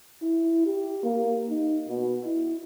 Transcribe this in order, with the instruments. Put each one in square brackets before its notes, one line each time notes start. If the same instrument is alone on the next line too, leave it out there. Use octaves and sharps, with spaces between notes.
[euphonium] E4
G4
A#3
D#4
B2
E4